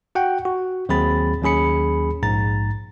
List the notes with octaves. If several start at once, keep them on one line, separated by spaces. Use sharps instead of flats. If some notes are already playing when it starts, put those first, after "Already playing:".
F#4 F#5 G5
F#4
D#2 F#3 C4 G#4 B5 A6
D#2 F#3 C#4 G#4 B5 C#7
A#1 G#2 A#5 A6